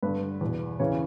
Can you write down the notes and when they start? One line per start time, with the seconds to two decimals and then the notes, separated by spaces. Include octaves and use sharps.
0.03 G2 D3 B4
0.41 E2 B2
0.79 E2 C#3 E3 C#5